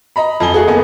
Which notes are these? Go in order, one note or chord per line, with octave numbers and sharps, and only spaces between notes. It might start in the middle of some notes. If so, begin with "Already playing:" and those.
D#5 A#5 B5
F2 F3 G#5 G7
A3 F#4 G#4
F#1 B3 G#5